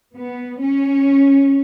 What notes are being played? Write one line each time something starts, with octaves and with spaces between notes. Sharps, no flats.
B3
C#4